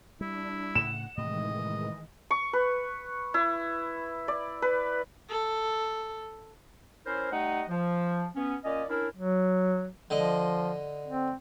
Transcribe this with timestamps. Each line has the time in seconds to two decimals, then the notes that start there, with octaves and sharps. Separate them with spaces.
0.21 G3 D4 E4
0.75 A2 C#3 F#5 E7
1.17 A2 C3 D#3 E3 G#3 D#5
2.31 C#6
2.53 B4
3.34 E4
4.28 D5
4.62 B4
5.29 A4
7.06 C#4 E4 A#4 C5
7.32 G3 A3 D#4 D#5 F#5
7.69 F3
8.36 B3 C#4
8.65 A#2 C#4 D5 D#5
8.89 C#4 D4 E4 A#4
9.16 F#3
10.10 D3 F3 D#5
11.06 C4